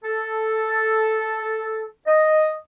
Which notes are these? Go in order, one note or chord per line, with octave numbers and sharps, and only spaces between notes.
A4
D#5